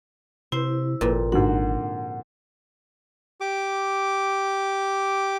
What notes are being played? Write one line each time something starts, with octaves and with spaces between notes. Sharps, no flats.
C3 E4 C5
G#1 F2 A#2
G#2 D3 F#4 F#5
G4 D6